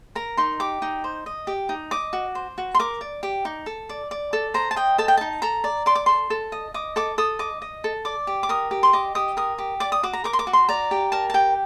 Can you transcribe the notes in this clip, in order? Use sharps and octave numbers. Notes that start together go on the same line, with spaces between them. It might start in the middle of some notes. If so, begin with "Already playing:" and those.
A#4 A#5
D#4 C6
G4 D6
D#4
C5
D#5
G4
D#4
D#5 D6
F#4
C5
F#4
C6
A#4 D6
D5
G4
D#4
A4
D5
D5
A4
C5 A#5
A5
D#5 G5
A4 A5
G5
D#4 A5
A4 A#5
D5
D5 C6
D6
A4 C6
A4
D#5
D#5 D6
A4 D6
A4 D#6
D#5 D6
D#5
A4
D5 D6
G4
D6
A#4 D#6
G4
C6
D#5 D6
G4 D#6
A#4 D#6
G4
D5 D6
D#6
F#4 D6
A#5
A#4 D6
C6
D6
F#4
C6
D5 A#5
G4
A#4 A5
A5
G4 G5